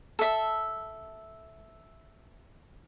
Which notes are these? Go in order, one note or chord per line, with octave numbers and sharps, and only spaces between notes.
A4 E5